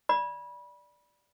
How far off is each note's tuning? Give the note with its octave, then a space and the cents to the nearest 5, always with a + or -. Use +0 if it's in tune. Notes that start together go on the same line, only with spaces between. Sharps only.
D5 +0 B5 -25